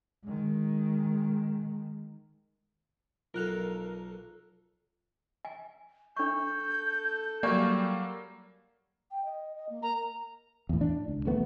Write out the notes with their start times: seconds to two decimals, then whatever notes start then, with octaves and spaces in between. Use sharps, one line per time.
0.25 D#3 G#3
3.34 B1 F4 A4 A#4 F5 F#6 F7
5.45 G#5
6.17 D4 A4 C#6 G6
7.43 F#3 G3 A#3 D5 G#5 C#6
9.11 G5
9.25 D#5
9.55 D#5
9.69 A#3
9.83 A#4 A#5
10.69 E2 A2
10.81 D4
11.08 C#2
11.25 D#1 A1 A3 B3